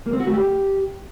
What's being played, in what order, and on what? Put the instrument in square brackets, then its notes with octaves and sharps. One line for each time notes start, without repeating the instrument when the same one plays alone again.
[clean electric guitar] A#3
C4
F#4
A3
G4